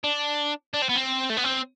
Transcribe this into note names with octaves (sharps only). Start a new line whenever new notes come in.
D4
D4
C4
B3
C4
A3
B3
C4